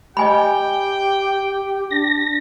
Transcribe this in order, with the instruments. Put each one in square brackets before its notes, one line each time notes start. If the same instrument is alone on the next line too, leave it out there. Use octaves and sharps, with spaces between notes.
[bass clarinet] G4 [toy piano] D#5 G#5 B5 [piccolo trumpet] G5
[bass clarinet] D4 [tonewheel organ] A#6